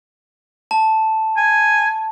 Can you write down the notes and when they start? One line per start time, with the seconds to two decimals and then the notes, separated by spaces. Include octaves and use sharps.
0.71 A5
1.37 G#5